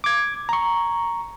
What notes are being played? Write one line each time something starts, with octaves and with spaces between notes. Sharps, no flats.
D6 G#6
A#5 C#6